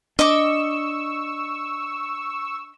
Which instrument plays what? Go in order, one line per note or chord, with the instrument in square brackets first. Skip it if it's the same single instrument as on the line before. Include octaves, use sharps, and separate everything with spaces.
[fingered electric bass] D4 [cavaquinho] D#5 D6 [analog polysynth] C#6 E6